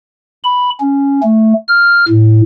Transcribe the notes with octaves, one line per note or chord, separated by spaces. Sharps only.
B5
C#4
A3
F6
A2